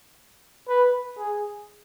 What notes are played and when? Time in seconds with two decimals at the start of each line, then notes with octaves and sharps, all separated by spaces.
0.69 B4
1.18 G#4